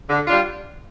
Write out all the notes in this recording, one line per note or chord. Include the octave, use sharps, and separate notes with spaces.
D3
G3 D4 F4